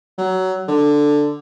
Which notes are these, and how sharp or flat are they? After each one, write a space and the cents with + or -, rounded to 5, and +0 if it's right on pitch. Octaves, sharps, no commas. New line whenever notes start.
F#3 +20
D3 +5